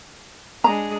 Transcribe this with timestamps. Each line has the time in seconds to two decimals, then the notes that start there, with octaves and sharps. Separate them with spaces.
0.64 G#3 D4 G#4 A#5